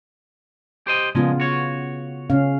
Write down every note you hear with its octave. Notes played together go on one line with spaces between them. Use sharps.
G4 C5 D#5
A#2 C#3 F3 G#3 B3 F4
F#4 C#5
C#3 C#4 F5